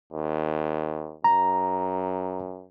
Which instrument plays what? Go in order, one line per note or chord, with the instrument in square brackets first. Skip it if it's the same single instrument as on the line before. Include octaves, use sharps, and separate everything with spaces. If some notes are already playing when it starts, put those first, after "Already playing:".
[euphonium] D#2
[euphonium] F#2 [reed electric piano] A#5